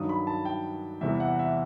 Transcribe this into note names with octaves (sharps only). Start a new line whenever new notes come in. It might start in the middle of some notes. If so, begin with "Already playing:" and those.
Already playing: G2 D#3 F#3 D#6
B5
A5
G5
E2 C3 E3 G3 E5
F#5
E5